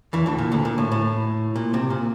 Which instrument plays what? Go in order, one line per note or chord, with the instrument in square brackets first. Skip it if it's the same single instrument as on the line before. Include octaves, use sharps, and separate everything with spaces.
[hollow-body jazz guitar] E2 E3
D2 D3
A#2
D2 D3
A#2
A2
A2
A#2
C2 C3
A#2